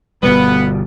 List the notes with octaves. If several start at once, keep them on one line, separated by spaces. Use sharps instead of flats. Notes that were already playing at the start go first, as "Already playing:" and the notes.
G1 B2 G3 B3